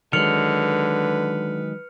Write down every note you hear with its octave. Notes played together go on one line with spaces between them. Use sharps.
D3 D#3 F#3 G#3 B4 F6 C#7 F7